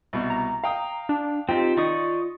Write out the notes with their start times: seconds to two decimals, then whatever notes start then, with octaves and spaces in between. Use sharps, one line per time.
0.13 C2 B2
0.30 A#5
0.64 F5 G5 D#6
1.09 D4
1.49 C4 D#4 F4 G4 G5
1.77 D#3 D#4 D5 C#6 D#6